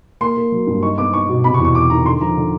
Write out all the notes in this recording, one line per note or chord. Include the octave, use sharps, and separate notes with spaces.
A#3 C6
A#3
F#3
G2
D#4 C#6
B3 D6
D#4 C#6
B2
C3 B5
C#6
E2
C#6
E2 D6
D#3 A#5
D3 C6
F3 A#5
D3